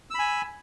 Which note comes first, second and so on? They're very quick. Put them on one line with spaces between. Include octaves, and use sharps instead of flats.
E6 B5 G#5